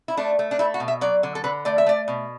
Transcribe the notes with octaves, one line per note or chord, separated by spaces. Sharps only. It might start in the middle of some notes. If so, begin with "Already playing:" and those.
E4
A3 D4
A3
D4
A3 E4
F#4
B2
E5
F#3 D5
D3
A4
D3 B4
A3 D5
E5
A3 D5
B2